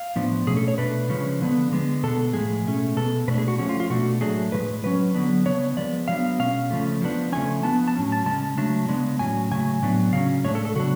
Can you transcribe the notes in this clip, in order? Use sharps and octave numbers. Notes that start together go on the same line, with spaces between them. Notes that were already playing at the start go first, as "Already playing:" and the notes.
Already playing: F5
A2 F3 B3 D4
B2 A3 C#4 G#4
A4
C#5
B2 A3 D4 B4
C#3 F3 G#3 C#4
D3 F3 B3 D4
D3 G#3 B3
B2 G#3 B3 A4
A2 F3 G#3 G#4
B2 A3 C#4
B2 G#3 B3 A4
B2 A3 D4 B4
G#4
F#4
F3 A3 C#4 F#4
F4
F4
B2 A3 D4 F#4
A2 F#3 A3 D4 G#4
A2 F3 G#3 B4
A2 F#3 C#4 B4
D3 F#3 B3 D4
C#3 F3 B3 D4 C#5
F3 G#3 B3 D5
D3 F#3 B3 D4 F5
B2 G#3 C#4 F5
C#3 F3 A3
F3 B3 D4
C#3 F3 A3 C#4 G#5
F3 B3 D4 A5
A5
A2 F#3 C#4
A5
C#3 G#3 C#4 A5
C#3 F#3 A3 D4 A5
C#3 G#3 B3 D4
A2 F#3 C#4 G#5
C#3 F#3 A3 G#5
A2 F#3 B3 D4
C#3 F#3 C#4 F5
A2 G#3 D4 C#5
A4
A4
C#3 F#3 B3 D4 F#4